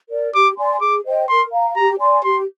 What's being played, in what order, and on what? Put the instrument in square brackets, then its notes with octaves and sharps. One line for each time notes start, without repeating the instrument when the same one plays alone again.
[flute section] A#4 D5
[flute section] G4 [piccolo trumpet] D6
[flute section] D5 G#5 C6
[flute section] G#4 [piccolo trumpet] D6
[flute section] C5 D#5 G5
[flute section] A#4 [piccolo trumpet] C6
[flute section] F5 A#5
[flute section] G4 [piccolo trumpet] A#5
[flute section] D5 G#5 C6
[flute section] G4 [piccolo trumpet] C6